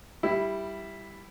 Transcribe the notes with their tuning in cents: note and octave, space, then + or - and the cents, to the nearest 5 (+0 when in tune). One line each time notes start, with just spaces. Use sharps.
G3 +0 E4 +0